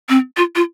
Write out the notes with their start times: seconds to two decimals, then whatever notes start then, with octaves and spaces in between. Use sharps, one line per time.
0.09 C4
0.37 F4
0.56 F4